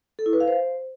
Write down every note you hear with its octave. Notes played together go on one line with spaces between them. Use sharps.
A4
E4
B4
F5
C5